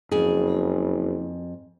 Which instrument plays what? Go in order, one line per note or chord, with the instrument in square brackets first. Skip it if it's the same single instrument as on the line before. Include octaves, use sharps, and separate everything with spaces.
[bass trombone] F#1 [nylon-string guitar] F2 G#4